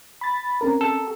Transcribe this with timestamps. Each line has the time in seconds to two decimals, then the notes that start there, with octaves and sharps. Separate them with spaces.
0.21 B5 A6
0.61 C4 C#4 A#4
0.81 A4